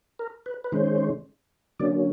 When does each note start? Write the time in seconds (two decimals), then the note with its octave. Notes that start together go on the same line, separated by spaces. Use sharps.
0.19 A#4
0.46 B4
0.64 B4
0.72 D#3 G#3 C#4 C5
1.80 D3 F#3 A#3 C#4 D5